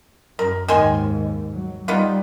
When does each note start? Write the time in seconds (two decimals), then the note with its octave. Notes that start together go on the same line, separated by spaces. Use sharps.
0.39 F#2 A#4
0.68 D#2 G#2 D#3 G#5 C6
1.53 F#3
1.88 G3 B3 D#4 F4